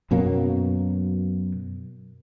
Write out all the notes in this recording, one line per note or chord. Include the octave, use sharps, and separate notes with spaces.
F#2 B2 F#3 A#3